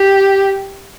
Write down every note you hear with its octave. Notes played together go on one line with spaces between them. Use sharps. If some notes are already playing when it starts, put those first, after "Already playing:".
Already playing: G4